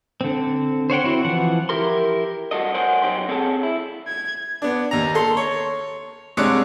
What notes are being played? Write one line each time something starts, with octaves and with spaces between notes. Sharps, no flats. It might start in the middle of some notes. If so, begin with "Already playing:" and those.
D3 C4
C5 C#5 F#5 G5
C4 E4 F#4
E3 F3 F#5
E4 G4 A#4 C6
G2 F#4 A4 D#5
A#4 C5 C#5 F#5 G#5 C6
B1 F#2 D#4 G4 C6
C4 G#4 A4 C#5 F#5 A5
E4
G#6
B3 D4
D#2 A#5
A4 C6
C#5
C2 G#3 D4 C#5 D6 F#6